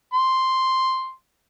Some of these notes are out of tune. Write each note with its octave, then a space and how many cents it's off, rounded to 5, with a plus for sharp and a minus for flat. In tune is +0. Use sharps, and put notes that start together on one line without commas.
C6 +0